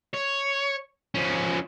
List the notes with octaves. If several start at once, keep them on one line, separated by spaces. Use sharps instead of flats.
C#5
F3 C#4